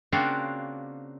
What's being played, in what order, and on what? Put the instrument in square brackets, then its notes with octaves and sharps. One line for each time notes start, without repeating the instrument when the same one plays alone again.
[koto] C#3 A#3 C4 D4 F4 F#4